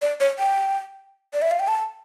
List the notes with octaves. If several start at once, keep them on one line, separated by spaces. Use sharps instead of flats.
D5
C#5
G5
D5
E5
F5
G5
A5